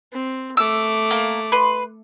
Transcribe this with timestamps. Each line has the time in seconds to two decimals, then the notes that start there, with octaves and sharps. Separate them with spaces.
0.12 C4
0.57 A3 D6 E6
1.11 A#3
1.52 B4 C6